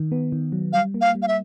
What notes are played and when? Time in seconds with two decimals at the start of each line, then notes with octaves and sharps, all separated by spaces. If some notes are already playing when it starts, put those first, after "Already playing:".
Already playing: D#3
0.12 B3
0.32 D#3
0.52 F#3
0.73 G3 F5
0.94 A#3
1.01 F5
1.15 G3
1.22 F5
1.28 E5